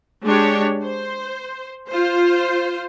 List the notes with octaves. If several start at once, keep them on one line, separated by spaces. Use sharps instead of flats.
G#3 D4 G4 C#5
C5
F4 C5